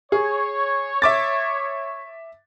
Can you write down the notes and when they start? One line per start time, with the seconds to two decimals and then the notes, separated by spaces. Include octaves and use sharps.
0.12 G#4 C#5
1.02 E5 D6 A6